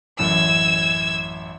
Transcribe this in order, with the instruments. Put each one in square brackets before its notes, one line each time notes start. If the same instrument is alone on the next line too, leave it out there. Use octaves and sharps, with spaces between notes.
[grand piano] A1 F#2 [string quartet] E6 G#6